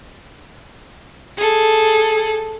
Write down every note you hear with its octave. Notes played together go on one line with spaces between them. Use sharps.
G#4 A4